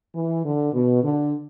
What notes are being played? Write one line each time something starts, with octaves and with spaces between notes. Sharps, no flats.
E3
D3
B2
D3